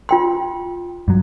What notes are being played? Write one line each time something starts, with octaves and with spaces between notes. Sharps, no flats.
F4 G5 C6
G2 F#3